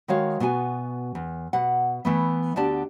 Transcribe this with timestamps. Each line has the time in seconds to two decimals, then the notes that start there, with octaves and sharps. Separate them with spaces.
0.08 D#3 G#3 F#4 C#5 F5
0.40 B2 B3 F#4 F#5 G#5
1.15 E2
1.53 B2 F#5
2.05 E3 A3 B3
2.56 D2 B3 D4 G4 D5 A5